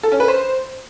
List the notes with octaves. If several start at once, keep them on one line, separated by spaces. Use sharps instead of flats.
A4
C#4
B4
C5